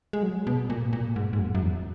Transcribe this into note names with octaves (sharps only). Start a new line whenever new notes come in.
G#3
F#3
B2
A#2
A#2
G#2
G#2
F#2
F#2
E2